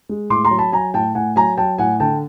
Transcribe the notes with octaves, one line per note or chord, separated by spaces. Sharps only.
G#3
A2 C6 D6
A#5 C6
F#3
A5 B5
F#3 G#5 A#5
A2 G5 A5
A2 F#5 G#5
F#3 G#5 A#5
F#3 G5 A5
A2 F#5 G#5
D3 G5 A5